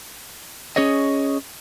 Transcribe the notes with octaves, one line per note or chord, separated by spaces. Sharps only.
C#4 G#4 C#5 D#5